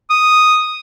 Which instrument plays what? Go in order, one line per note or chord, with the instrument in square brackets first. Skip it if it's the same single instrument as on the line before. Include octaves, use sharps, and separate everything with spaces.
[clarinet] D#6